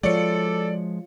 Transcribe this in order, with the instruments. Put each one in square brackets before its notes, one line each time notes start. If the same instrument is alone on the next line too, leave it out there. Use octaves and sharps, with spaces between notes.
[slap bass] F3 G#3 [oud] F4 F#4 C#5 [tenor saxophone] A4 [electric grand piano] D5 C#7